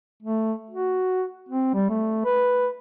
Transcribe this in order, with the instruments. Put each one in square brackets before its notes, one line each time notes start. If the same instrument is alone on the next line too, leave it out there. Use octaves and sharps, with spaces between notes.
[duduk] A3
F#4
C4
G3
A3
B4